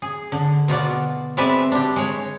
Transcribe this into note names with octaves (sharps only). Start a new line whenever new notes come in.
G#4
D3
B2 F4 F#4 D5
G#3 C4 B4 D5 E5
D4 G4
G#3 C#5